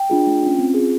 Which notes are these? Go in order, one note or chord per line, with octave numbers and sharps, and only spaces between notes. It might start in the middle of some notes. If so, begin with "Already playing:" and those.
Already playing: G5
D4 F4 G#4
A3
C#4 F4
C4
G#4
F4